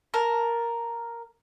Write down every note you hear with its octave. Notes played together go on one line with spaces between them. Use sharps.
A#4 A5